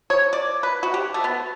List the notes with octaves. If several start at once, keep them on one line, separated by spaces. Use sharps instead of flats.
C#5
D5
B4
F#4
G4
A3
B3